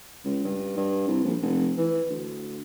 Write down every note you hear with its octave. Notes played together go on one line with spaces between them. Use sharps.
C#2
G2
G2
C2
A#1
F1
E3
D2